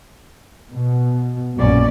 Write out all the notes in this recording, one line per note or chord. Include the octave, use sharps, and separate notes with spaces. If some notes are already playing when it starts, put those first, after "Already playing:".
B2
A#1 F#2 B2 A#3 C#4 D5